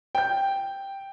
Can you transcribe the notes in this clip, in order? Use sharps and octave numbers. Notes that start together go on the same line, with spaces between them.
G5 G6